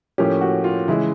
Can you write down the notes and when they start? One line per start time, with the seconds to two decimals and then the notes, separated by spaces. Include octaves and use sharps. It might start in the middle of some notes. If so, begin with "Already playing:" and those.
0.18 A2 F3 A#3 C#4 G4
0.41 F#4
0.64 F4
0.88 C#3 E3 G#3 E4